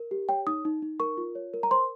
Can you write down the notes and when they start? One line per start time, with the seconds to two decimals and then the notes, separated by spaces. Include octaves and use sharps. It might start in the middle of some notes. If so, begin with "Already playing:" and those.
Already playing: A#4
0.11 G4
0.29 C#5 G5
0.47 D#4 D#6
0.65 D#4
0.82 D#4
1.00 A#4 C#6
1.18 F4
1.35 C#5
1.54 A#4
1.63 A#5
1.71 C5 C6